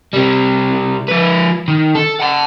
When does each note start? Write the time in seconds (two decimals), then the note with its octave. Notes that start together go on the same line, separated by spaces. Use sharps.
0.13 C3 G3
1.09 F3 B4
1.68 D#3
1.95 A4
2.20 F#5 A5